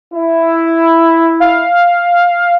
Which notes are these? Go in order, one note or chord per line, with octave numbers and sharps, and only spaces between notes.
E4
F5